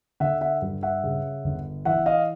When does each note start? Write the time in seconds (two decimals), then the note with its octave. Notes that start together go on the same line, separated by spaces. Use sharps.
0.20 D3 E5 F#5
0.41 E5 F#5
0.62 G2
0.83 E5 F#5
1.04 C#3
1.44 G1
1.85 E3 E5 F#5
2.06 D#5 F5